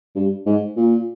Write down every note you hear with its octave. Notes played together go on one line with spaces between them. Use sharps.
G2
G#2
A#2